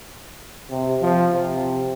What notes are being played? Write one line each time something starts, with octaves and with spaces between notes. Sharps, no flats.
C3
F3
C3